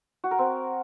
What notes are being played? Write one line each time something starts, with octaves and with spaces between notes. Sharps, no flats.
F#4
A#4
C4